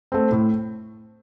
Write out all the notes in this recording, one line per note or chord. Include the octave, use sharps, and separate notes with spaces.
A3 C4
A2